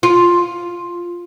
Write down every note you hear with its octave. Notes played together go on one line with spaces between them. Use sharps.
F4